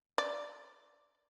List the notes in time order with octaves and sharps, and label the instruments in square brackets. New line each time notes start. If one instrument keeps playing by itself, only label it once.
[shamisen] D5